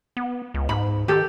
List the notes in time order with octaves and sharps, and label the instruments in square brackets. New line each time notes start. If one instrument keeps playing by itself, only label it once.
[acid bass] B3
C#2
[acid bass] G#2 [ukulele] B5
[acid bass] D#3 [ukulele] G4 A4